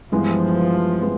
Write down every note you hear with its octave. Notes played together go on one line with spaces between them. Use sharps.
G2 E3 F3 G#3 B3
G#3 B3